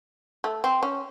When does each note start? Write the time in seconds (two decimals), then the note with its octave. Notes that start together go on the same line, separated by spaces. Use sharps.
0.44 A3
0.64 C4
0.83 C#4